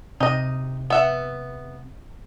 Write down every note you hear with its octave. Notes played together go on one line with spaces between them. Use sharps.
C3 D#4 D#5
B3 E5 F#5